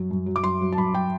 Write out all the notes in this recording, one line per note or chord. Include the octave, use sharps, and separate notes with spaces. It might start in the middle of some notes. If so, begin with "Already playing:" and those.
Already playing: F#2 F#3
F#2
F#3
D6
F#2 C6
F#3
A5
F#2 B5
F#3 G5